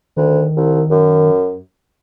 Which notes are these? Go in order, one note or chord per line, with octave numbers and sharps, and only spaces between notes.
D2 D#3
C2
F#2